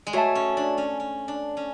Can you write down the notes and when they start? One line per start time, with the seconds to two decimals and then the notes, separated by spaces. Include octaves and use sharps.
0.07 G#3
0.13 A3 F#4 C#5 E5 A5
0.35 C#4
0.57 D4
0.78 C#4
1.00 C#4
1.28 D4
1.57 C#4